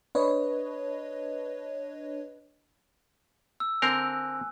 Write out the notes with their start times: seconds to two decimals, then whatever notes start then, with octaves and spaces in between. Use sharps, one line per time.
0.15 D4 B4 C#5 D#5
3.60 E6
3.82 D3 C4 A#4 G#5 F#6